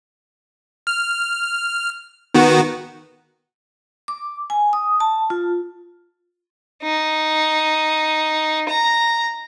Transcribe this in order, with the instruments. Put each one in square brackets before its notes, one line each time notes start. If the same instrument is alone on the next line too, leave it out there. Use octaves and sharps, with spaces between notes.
[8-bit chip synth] F6
D#3 B3 F#4
[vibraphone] D6
G#5
D#6
A5
F4
[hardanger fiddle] D#4
A#5